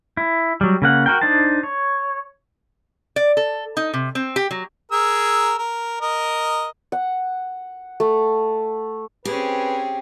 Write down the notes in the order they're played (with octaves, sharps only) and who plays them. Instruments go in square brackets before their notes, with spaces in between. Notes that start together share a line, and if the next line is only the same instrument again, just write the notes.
[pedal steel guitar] E4
F#3 G3
C#3 A#3 F#5
F#4 A#4 G5
D4 D#4 C5 A5
C#5
[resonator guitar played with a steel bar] D5
A4
D#4
C3
C4
G4
F#3
[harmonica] G#4 A#4 E6
A#4
A#4 D#5
[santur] F#5
A3
[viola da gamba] C4 C#4 G#4 [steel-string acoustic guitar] G4 [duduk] B4